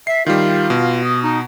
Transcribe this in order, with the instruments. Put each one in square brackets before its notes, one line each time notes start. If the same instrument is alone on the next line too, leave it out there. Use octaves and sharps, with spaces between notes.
[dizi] E5 [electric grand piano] C7
[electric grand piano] D#3 G3 [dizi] F4
[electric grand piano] B2
[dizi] D#6
D#4